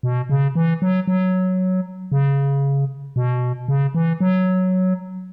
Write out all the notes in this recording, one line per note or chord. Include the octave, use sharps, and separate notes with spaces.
B2
C#3
E3
F#3
F#3
C#3
B2
C#3
E3
F#3